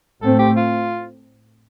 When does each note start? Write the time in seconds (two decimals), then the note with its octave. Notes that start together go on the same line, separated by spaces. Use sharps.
0.21 A2 A3 C4 A4
0.39 G4
0.57 F4